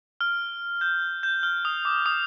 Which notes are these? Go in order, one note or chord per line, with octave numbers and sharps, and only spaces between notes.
F6
G6
G6
F6
D#6
D6
D#6